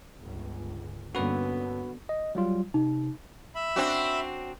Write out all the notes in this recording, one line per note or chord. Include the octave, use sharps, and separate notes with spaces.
G1 C#2
G2 D3 A#3 B3 C#4 F#4 B4
D#5
F#3 G3 F4
C3 D#4
E5 B5
C4 D4 F#4